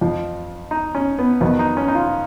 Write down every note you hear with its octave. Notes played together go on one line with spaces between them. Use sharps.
F2 F3
D#4
C#4
B3
F2 D#3 F#3 B3
D#4
C#4
D#4
F4